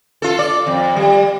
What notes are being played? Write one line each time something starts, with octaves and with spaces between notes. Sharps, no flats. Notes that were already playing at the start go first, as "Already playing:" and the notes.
F4 A4
D5
F2
G3